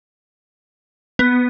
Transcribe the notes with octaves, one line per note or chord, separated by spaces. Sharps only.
B3